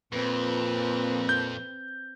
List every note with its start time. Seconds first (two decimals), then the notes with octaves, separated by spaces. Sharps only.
0.13 F2 A#2 C4 B4
1.29 G6